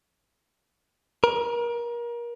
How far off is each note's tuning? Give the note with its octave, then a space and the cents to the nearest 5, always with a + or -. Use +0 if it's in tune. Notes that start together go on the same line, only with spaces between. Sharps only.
A#4 +30